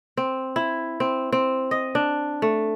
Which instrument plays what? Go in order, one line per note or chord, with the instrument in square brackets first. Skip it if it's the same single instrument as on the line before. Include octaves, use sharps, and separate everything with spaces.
[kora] C4
E4
C4
C4
D#5
D4
A3